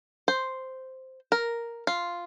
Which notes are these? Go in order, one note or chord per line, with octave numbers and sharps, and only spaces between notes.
C5
A#4
F4